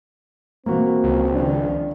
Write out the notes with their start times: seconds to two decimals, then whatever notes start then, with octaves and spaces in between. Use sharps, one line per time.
0.66 B2 E3 A#3 C4 F#4
1.04 C#2 F3
1.35 D#3 F3 D4